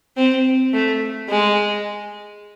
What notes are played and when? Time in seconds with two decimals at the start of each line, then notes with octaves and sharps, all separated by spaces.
0.17 C4
0.73 A3
1.29 G#3